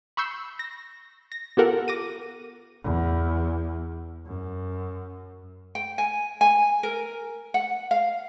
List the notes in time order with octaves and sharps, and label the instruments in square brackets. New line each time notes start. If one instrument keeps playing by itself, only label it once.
[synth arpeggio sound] B5 C#6 E6 G6 C7
A#6
A#6
B3 F4 G4 A4 A#4 F#5
D6 A#6 D#7
[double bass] E2
F#2
[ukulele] G5
G#5
G#5
A#4
F#5
F5